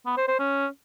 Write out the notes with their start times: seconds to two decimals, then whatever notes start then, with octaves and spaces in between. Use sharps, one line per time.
0.06 B3
0.17 C5
0.28 C5
0.39 C#4